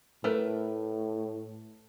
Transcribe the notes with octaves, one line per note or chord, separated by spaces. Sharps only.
A2 A3 A#4 B4